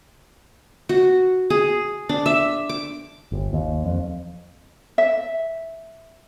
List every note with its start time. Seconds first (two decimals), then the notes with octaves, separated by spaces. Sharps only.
0.89 F#4
1.50 G#4
2.09 D4
2.26 E5
2.69 D6
3.32 G1
3.53 D#2
3.86 F2
4.98 E5